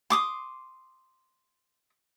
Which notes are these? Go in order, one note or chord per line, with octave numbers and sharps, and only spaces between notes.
C6 D6 D#6